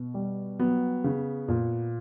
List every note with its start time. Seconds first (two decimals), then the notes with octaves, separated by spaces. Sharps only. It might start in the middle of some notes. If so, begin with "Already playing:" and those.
Already playing: B2
0.14 G3
0.59 F#3 B3
1.04 C#3
1.48 A#2